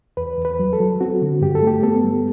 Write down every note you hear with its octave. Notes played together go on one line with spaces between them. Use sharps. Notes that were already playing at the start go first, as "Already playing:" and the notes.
E2 B4
E2
B4
F#3
A4
F#3
C4 F#4
D3
G2 G4
A4
A3 G4
B3 A4
G3